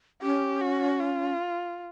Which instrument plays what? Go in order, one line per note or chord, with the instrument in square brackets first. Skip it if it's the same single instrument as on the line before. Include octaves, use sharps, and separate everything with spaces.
[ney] C#4 [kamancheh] G4
[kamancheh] F#4
F4